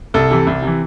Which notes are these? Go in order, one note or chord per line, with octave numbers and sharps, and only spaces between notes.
C2 A4
C3 E3
C2
C3 E3